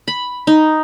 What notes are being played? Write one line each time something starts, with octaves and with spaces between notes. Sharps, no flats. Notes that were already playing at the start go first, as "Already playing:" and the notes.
B5
D#4